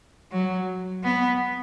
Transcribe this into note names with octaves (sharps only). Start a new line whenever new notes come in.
F#3
B3